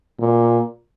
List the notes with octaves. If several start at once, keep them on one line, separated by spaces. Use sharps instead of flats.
A#2